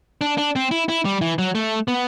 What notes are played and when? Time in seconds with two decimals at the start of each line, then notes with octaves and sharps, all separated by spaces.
0.21 D4
0.38 D4
0.56 C4
0.71 E4
0.89 E4
1.05 G3
1.21 E3
1.39 F#3
1.55 A3
1.88 B3